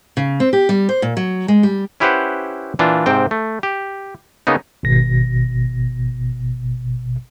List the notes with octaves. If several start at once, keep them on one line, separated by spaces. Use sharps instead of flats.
C#3
C4
G4
G3
C5
A#2
F#3
G#3
G3
C#4 E4 G4 B4 C5 F#5
A#2 E3 D4 F4
G#2 C3 C4 G5
A3
G4
C#3 A#3 B3 D#4
G#1 B2 A#6